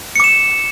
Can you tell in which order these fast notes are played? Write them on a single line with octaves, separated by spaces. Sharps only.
C#7 D6 E7